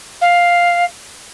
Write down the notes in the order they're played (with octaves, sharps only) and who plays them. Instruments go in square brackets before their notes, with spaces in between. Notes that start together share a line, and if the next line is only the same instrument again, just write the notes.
[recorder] F5